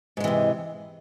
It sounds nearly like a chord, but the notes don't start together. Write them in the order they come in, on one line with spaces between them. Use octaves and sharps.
G#2 G#3 E3 C3